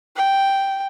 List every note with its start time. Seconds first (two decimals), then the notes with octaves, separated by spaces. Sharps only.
0.16 G5